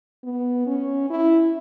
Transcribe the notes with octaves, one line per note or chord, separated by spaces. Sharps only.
B3
C#4
E4